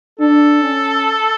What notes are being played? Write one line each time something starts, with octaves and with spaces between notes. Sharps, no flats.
D4 A4
C#4